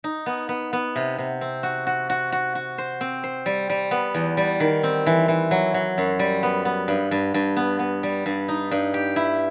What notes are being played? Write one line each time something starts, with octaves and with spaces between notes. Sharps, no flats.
D#4
B3
B3
B3
C3
C3
C4
F#4
F#4
F#4
F#4
F#4
C5
C4
C5
G3
G3
B3
E2
G3
D#3
C4
E3
E3
F#3
F#3
F#2
G3
B3
B3
G2
G2
G2
B3
B3
G3
G2
D#4
G2
G4
E4